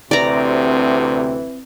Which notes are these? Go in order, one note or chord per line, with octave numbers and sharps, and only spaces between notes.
D2 C3 E3 C4 D5 A#5